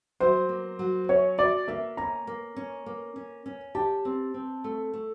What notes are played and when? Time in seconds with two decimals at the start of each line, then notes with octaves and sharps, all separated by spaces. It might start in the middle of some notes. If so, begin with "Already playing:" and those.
0.20 F#3 C5
0.49 A#3
0.79 F#3
1.09 C#4 C#5
1.38 F#4 D5
1.68 A#3 E5
1.97 C#4 A#5
2.27 A#3
2.56 C#4
2.86 A#3
3.16 C#4
3.46 C#4
3.75 G4 A5
4.05 C4
4.34 C4
4.64 A3
4.93 A3